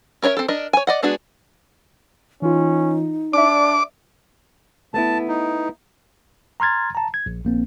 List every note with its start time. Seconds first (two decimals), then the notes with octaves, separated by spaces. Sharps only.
0.22 C#4 A#4 C#5 D#5 E5
0.37 C4 A4
0.48 D4 A#4 D#5
0.73 C#5 G#5
0.87 D5 D#5 F#5
1.03 G#3 B3 D4 F#4 G#4
2.42 E3 C#4 D#4 F4
3.33 D4 D5 E5 D6
4.94 A3 B3 E4 A5
5.28 D#4
6.60 A#5 C6 F6 G#6 A6
6.95 A5 A#5
7.14 G#6
7.26 A#1
7.45 A#1 A#3 C4